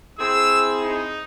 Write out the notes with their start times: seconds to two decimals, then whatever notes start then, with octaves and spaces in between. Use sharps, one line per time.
0.19 C4 E4 G#4 E6
0.82 D#4